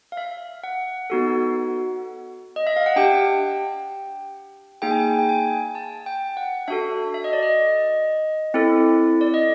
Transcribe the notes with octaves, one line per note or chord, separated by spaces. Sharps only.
F5
E5
F#5
B3 D#4 F#4 A4
D#5
E5
F5
F#5
D4 G4 G5
A#3 D#4 G#4 G5
G#5
G5
G5
G#5
A5
G5
F#5
D4 F#4 A4 E5
E5
D#5
D5
D#5
C4 E4 A4
D5
D#5